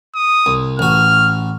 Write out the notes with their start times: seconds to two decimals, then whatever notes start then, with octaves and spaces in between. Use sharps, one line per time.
0.15 D#6
0.46 C2
0.79 A1 F#4 F6